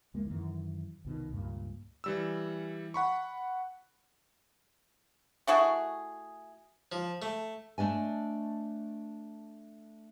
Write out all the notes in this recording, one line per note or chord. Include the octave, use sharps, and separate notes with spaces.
C#2 G#3 A#3
F#2 D#3 E3
C2 B2 D#3
C#2 G2 A#2
E3 G3 E6
F#5 B5 C#6
A3 E4 F#4 G#4
F3
A3
A3 D4 D#5 G#5